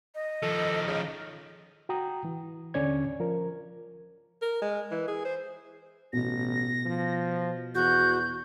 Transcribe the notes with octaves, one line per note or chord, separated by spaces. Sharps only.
D#5
D#3 F3 A4
C#3
F#4 G5 A#5 D#6
E3
D#2 D3 C#4 C#5 D5 G#6
F3 A#4
A#4
G#3
E3
G#4
C5
A1 B2 A#6
F3
E2 F#4 G6